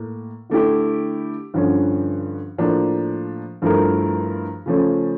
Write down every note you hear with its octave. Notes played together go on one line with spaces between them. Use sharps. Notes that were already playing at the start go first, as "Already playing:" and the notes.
Already playing: A2 A#3
D3 A3 E4 G4
G2 D3 F3 C#4
A2 F3 A#3 D4
G2 F3 A3 E4 A#4
C#3 F3 A3 C#4